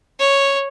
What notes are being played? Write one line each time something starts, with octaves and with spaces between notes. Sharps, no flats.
C#5